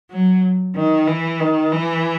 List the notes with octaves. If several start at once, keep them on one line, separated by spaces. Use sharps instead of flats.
F#3
D#3
E3
D#3
E3